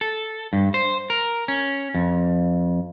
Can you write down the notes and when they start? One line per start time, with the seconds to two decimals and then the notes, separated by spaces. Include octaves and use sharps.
0.01 A4
0.53 G2
0.74 C5
1.10 A#4
1.48 C#4
1.95 F2